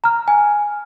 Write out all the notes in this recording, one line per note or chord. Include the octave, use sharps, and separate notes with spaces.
A#5 F6
G#5